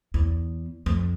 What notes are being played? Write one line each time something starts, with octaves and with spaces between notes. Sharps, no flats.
E2
F2